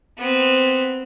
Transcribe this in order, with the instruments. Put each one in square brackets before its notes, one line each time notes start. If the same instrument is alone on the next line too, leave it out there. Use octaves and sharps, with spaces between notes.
[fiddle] B3 C4